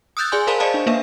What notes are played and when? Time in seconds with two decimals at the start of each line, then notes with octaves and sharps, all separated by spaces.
0.17 D#6 E6 F#6 G6 A6
0.32 G#4 D5 G#5 C6
0.47 A#4 C5 F5 G#5 A5 B5
0.60 C5 D5 D#5 F5 A5
0.74 D4
0.86 A#3 D4 B4 E5 F5